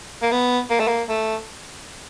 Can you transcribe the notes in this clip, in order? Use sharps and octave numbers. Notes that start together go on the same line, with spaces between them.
A#3
B3
A#3
A3
A#3
A3